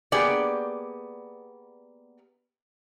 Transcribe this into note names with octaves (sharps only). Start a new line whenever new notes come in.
A#3 B3 G4 G#4 D5